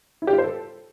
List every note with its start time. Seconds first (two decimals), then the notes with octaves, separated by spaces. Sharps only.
0.22 E4
0.27 G4
0.33 F4
0.38 C5
0.44 A4